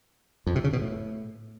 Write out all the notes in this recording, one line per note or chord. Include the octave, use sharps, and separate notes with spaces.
F2
C3
C#3
B2
A2